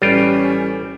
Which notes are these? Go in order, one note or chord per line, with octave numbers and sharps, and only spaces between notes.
A1 G3 C#4 F4 G5